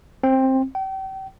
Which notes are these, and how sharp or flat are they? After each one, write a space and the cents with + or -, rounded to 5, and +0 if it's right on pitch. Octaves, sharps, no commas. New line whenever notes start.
C4 +15
G5 -35